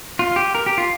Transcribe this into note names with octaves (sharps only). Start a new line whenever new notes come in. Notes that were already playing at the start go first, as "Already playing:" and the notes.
F4
G4
A#4
G4
F4